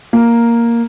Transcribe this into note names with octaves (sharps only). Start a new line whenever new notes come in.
A#3